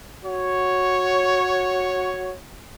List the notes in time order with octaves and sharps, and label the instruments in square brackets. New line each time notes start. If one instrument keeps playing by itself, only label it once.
[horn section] F#4 C#5